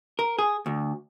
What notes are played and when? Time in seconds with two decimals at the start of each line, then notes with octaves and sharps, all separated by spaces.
0.19 A#4
0.39 G#4
0.66 D2